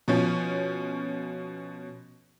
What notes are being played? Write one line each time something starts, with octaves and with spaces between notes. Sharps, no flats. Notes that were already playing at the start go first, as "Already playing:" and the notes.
B2 F3 C#4